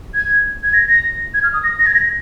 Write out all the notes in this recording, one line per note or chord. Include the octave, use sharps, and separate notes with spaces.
G#6
G#6
A#6
A#6
G#6
F6
D#6
A#6
A#6
G#6
A#6